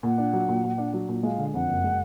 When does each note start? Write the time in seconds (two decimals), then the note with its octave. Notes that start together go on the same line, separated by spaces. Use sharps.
0.03 A#2 F#5
0.18 D4
0.33 F#3
0.48 A#2
0.64 A#2
0.78 D4
0.93 F#3
1.08 A#2
1.23 G#3 F5
1.38 D3
1.54 F2 F#5
1.68 F#1
1.84 G#3